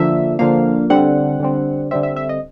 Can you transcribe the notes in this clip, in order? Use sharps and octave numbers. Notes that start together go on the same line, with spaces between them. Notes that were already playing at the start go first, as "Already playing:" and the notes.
Already playing: D3 F3 A#3 E5
D3 F3 A#3 F5
D3 G3 C4 F#5
D3 G3 C4
D3 G3 C4 E5
E5
E5
D#5